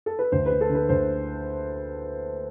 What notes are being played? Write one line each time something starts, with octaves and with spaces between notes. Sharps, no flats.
A4
B4
D2 C5
B4
D3
A4
D3
B4
D2 C5